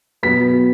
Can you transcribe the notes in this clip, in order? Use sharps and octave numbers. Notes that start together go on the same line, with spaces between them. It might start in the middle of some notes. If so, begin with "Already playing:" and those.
B2 F#3 B3 B6